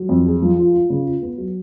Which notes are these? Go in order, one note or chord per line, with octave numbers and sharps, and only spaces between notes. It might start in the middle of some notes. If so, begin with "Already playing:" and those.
Already playing: F#3
F2
G#4
F3
F4
F4
C#3
F4
B3
F#3